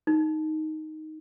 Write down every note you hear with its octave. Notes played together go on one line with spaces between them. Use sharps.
D#4